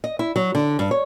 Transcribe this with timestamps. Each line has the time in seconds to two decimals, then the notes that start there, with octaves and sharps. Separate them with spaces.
0.04 D#5
0.19 E4
0.36 F#3
0.55 D3
0.79 G2
0.91 C#5